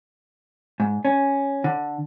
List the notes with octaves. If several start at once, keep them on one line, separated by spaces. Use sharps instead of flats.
G#2
C#4
D3